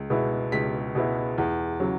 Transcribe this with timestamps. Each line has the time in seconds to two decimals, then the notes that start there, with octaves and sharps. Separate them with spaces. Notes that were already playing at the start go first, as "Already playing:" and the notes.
Already playing: C#2
0.10 B2 G#3 B3 E4
0.52 C#2 B6
0.95 B2 G#3 B3 E4
1.38 E2
1.80 C#3 F#3